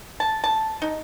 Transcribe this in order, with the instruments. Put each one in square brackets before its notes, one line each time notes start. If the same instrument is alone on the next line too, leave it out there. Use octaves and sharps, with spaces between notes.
[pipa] A5
A5
D#4